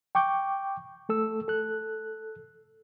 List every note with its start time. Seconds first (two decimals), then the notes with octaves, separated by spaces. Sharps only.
0.15 G5 C#6 D6 G6
1.09 A3 A4 E6
1.48 A4 F#6